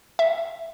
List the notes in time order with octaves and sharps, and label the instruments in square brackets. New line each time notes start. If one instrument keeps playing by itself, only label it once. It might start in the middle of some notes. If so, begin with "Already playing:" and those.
[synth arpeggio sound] E5